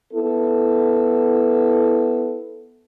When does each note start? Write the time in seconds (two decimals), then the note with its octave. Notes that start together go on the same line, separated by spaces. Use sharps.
0.14 B3 E4 A4